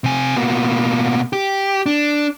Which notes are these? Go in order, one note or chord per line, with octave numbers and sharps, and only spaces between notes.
C3 G#5
B2 A#3
G4
D4